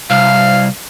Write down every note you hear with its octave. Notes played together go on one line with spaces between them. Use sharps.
C2 F5